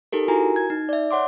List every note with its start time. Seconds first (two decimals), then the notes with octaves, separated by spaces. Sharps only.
0.12 D#4 G4 A4 A#4
0.28 E4 F#4 A#4 G#5 A#5
0.56 G#6
0.70 D#4
0.89 D5 E5
1.11 C#5 F#5 C6 D6